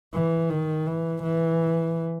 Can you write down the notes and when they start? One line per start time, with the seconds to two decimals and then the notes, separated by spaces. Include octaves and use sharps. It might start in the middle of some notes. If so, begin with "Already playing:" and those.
0.14 E3
0.50 D#3
0.87 E3
1.23 E3